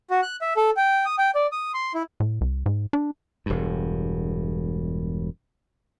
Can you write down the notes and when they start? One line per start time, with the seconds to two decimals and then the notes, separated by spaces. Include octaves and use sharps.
0.10 F#4
0.22 F#6
0.41 E5
0.57 A4
0.77 G5
1.05 D#6
1.18 G5
1.35 D5
1.52 D#6
1.74 C6
1.94 E4
2.20 A2
2.41 C2
2.66 G#2
2.93 D4
3.46 E1 G2